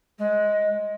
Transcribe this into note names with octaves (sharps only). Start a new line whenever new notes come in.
G#3